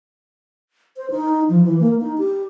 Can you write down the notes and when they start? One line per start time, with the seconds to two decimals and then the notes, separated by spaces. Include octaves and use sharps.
0.97 C5
1.11 D#4
1.49 F3
1.64 E3
1.81 A#3
2.01 D#4
2.18 G4